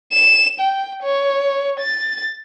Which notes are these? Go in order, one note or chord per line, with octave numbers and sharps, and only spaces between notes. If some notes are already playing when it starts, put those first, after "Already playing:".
E7
G5
C#5
A6